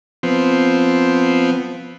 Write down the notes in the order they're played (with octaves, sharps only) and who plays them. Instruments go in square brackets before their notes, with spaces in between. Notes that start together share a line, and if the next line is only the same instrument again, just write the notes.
[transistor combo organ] F3 B3 C4